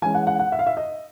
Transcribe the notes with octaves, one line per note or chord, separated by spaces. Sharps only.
E3 G#3 C#4 G#5
F#5
F#5
F#5
E5
F5
E5
D#5